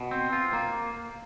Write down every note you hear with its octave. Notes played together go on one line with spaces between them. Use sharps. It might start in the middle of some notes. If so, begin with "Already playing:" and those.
Already playing: B2
C4
F4
A#3